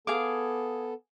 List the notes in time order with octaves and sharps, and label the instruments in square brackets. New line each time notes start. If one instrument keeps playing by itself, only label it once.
[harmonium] B3 A4 [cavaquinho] G#4 F5 D6